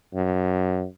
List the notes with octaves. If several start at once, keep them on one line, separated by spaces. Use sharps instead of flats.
F#2